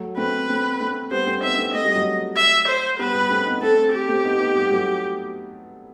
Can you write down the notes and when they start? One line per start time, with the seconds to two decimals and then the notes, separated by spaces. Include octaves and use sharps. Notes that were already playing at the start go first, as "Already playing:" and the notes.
Already playing: F#3 A3
0.17 A3 C4 B4
0.48 A3 C4
0.80 A3 C4
1.11 G3 B3 C5
1.27 A3 C4
1.43 B3 D#4 E5
1.58 A3 C4
1.74 A3 D#5
1.85 G3
1.95 F#3 A3
2.36 E5
2.68 C5
2.99 G3 B3 B4
3.14 G3 B3
3.30 A3 C4
3.46 B3 D#4
3.61 A3 C4 A4
3.77 A3 C4
3.93 G4
4.08 A3 C4
4.24 B3 D#4
4.40 B3 D#4
4.55 G3 B3
4.71 F#3 A3